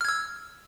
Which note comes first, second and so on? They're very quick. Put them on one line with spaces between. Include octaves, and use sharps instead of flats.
F6 G#6 E6